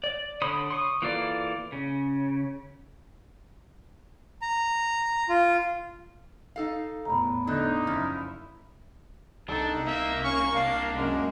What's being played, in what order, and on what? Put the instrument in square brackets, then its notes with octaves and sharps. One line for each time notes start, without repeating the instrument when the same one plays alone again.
[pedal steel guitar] D5
D3 C#5 B5 C6 D#6
C6 C#6 D#6
E3 A#3 F4 A4 D5
C#3
[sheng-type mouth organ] A#5
F4
[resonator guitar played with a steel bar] D#4 A4 F5
[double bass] E2 A2 [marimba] A#5 B5
[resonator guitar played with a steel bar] D3 [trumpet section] D#4 [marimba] D5 F#6
[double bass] F#1 E4 [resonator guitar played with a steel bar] F3 C#4 [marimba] F6
[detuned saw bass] C2 [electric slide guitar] D4 [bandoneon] D#4 [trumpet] A4
[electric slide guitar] A#3 [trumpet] E5
[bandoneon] C#4 [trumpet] C#6
[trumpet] D4 [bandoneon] F5
[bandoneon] F#2 G#3